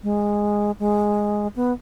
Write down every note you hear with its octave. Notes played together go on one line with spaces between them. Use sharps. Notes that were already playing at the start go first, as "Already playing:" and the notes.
G#3
G#3
B3